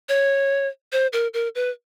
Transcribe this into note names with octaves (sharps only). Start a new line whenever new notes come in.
C#5
C5
A#4
A#4
B4